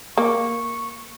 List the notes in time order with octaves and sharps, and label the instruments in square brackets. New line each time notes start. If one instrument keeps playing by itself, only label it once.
[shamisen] A#3 [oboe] C#6